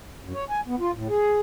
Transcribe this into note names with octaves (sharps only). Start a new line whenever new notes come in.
F#2
C#5
G#5
B3
F4
A2
G#4